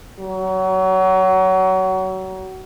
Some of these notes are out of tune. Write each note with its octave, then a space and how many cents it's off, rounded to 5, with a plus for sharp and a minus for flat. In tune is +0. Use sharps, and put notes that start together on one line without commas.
F#3 +25